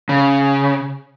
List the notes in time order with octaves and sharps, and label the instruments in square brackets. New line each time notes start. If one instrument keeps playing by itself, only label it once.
[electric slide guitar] C#3